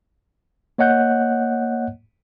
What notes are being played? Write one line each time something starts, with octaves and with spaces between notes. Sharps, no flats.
A#3 C#5 D#5 F#5 F#6 G6